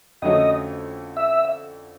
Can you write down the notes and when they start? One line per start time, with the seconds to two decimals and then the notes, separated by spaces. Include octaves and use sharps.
0.22 F2 D3 F#3 A3 C#4 D#5
1.17 E5